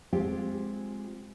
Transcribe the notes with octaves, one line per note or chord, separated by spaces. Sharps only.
G#3 C4 F4 G4